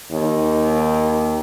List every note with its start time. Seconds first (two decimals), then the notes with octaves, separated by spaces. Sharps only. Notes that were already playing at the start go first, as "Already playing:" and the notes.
0.12 D#2